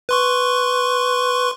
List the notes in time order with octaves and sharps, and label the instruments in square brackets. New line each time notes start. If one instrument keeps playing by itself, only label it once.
[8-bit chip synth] B4 C6 C#6